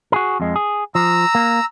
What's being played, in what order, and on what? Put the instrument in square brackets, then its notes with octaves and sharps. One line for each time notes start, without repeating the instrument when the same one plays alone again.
[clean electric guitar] F#4 G#4 A#4
F2 G#3
G#4
[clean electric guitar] F3 [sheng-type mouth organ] A#5 E6
[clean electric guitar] A#3